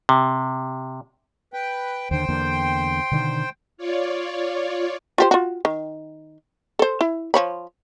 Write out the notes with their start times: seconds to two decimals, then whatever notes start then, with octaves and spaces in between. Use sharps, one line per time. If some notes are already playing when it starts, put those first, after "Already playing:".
0.09 C3
1.53 B4 G5
2.11 D#2 D3 C5 G5
2.29 E2 D3 A#3
3.12 B2 D3 D#3
3.77 F4 C#5 D5
5.18 F4 G4 C5
5.31 F4 F#4
5.65 D#3
6.79 A4 C5
7.01 E4
7.34 F3 C#5 B5